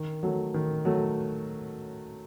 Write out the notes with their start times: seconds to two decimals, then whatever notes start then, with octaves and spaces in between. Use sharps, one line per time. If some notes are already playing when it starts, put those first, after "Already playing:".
Already playing: D#3
0.23 F#3 A3
0.54 D#3
0.85 F#3 A3